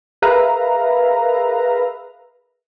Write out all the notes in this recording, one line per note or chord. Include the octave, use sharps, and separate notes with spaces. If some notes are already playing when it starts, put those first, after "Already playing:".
G#4 A#4 B4 E5 F5 A#5